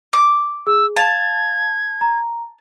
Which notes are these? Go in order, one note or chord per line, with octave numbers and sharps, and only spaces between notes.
D6
G#4 E6
F5 A5 G#6 F7
A#5